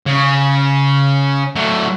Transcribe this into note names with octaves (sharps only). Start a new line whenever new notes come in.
C#3
F#3 A3